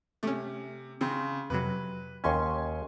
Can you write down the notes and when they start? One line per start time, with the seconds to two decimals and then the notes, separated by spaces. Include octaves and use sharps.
0.23 C3 A3 C#4
1.01 C#3 C4 C6
1.50 F2 C3 F#3 B4
2.24 D#2 C#4 G#5 C6 C#6